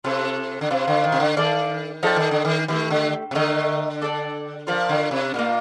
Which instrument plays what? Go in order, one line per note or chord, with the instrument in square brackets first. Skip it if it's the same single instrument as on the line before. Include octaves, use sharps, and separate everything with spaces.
[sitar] C3 [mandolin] F4 A4 C5
[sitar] D3
[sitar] C3 [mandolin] D4 F4 C5
[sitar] D3
D#3
C3
D3
[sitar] D#3 [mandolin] D4 A4 D5 F5
[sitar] F3 [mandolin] D#4 A4 D5 G5
[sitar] D#3
D3
D#3
[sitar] D#3 [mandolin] A3 C4 G4
[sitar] D3
C3
[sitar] D3 [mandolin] A3 D#4 A#4 D#5
[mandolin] D4 A4 D5 G5
[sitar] F3 [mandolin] F4 A#4 D5
[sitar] D3
C3
[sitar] A#2 [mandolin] A#3 D#4 G4 A#4